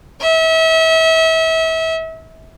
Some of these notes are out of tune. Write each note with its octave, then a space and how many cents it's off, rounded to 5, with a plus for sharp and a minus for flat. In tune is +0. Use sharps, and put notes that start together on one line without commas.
E5 -35